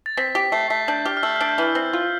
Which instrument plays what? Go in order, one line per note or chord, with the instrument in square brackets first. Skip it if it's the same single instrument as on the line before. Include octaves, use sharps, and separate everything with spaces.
[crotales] A6
[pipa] C4 [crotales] B6
[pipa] G4 [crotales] B6
[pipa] A3 [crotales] C7
[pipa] A3 [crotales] B6
[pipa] D4 [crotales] G6
[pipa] G4 [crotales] F6
[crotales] F6
[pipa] A3 [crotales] E6
[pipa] D4 [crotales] F6
[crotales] G6
[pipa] E3 [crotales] F6
[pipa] C4
F4